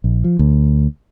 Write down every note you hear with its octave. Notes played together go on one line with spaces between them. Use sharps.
A#1
F3
D2